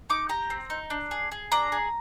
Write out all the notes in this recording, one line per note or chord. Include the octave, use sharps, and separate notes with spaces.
D#4 D6
G4 A#5
C4
D#4
D4
G#4
G#4
D4 A#5
G#4